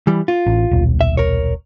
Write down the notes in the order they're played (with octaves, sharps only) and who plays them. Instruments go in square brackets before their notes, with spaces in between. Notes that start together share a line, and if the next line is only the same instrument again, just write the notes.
[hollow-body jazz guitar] E3 G3
F4
[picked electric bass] A1
D#1 B1
[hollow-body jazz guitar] E5
A#4 C#5